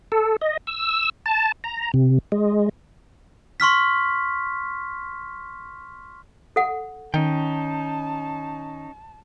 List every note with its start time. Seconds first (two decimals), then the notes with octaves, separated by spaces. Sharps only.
0.12 A4
0.41 D#5
0.67 E6
1.26 A5
1.64 A#5
1.94 C3
2.32 G#3
3.60 C6 C#6 F6 B6
6.56 A4 F#5
7.14 D#3 C#4 D#4 G5 A5